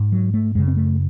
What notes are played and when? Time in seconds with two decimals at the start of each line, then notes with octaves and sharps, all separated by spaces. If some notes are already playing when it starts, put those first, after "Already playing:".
Already playing: G#2
0.12 F#3
0.34 A3
0.55 F#2 C#3 G#3
0.68 C4
0.77 A3